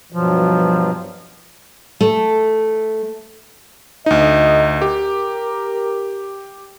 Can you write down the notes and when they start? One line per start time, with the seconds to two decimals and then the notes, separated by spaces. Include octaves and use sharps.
0.12 G2 B2 F3 F#3
2.01 A3
4.06 D2 D#4 D#5
4.82 G4 A#4